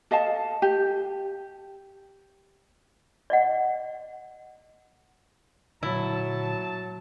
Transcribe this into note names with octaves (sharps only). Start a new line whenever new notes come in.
A4 D#5 F5 A5
G4
D5 D#5 F#5
A#2 D3 F#3 E4 A5